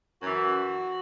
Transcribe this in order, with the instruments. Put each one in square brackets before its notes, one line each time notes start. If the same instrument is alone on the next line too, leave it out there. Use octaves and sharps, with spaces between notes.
[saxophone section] F#2 E3 F#4